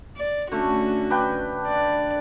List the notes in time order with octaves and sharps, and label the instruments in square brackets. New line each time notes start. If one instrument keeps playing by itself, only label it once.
[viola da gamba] D5
[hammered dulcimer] D3 A3 [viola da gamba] C#4 F#4
[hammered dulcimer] D4 B4 G5
[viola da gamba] D5